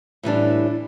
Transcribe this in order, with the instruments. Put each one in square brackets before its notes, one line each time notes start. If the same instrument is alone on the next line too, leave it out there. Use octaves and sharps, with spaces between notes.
[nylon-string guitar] A2 E3 G3 D4